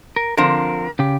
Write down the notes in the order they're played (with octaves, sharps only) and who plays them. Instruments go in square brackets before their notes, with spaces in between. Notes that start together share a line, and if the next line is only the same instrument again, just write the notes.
[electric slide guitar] A#4
[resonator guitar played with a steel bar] D3 F3 C4 [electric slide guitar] A#4
[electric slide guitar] C#3 G4